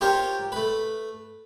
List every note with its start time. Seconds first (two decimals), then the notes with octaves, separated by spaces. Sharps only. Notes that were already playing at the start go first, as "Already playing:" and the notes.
0.01 F4 G4 A#4 C5 C#5
0.52 A3 B4